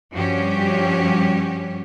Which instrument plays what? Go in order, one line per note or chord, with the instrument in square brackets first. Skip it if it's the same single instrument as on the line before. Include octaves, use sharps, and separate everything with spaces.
[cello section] G2 F3 G3 C#4 F#4 G4